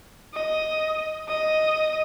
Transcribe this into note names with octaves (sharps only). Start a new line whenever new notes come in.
D#5
D#5